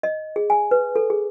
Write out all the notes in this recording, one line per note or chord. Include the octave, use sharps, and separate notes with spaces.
D#5
G#4
G#5
B4
A4
G#4